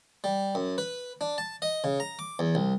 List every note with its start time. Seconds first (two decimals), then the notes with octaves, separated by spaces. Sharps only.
0.24 G3
0.55 F#2
0.78 B4
1.21 D4
1.38 A5
1.62 D#5
1.84 C#3
2.00 A#5
2.19 D6
2.39 E2
2.55 C2